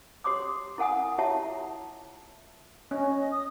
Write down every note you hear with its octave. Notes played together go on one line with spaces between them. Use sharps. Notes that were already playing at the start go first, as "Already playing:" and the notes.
G4 C#5 C6 D6 D#6
E4 A#4 F#5 G#5 D#6
E4 F4 G4 C#5 E5 A5
C#4 D#5
D#6